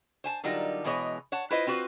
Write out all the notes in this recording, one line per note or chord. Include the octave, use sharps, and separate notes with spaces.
C5 G#5 A5
D3 F#3 G3 D#4 F4 A#4
B2 E3 G#3 B3 C#5 D#5
C#5 F#5 A5
E4 F4 B4 C5 D#5
C4 F4 F#4 B4 C5